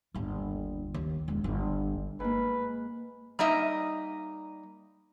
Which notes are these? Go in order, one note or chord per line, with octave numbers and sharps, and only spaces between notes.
G1 D#2
D#2
E1
G1
G#2 A#3 B4
G3 A#3 D#4 D#5 E5